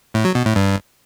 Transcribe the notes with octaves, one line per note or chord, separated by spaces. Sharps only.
A2
F#3
B2
A2
G2